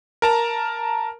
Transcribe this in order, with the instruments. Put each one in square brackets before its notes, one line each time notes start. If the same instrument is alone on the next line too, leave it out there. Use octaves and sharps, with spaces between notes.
[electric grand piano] A#4 A5 A#5